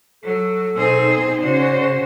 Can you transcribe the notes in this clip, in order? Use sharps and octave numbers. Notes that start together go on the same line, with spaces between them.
F#3 A4
B2 C4 D#4 G#4
C#3 C#4 F#4 C5 D5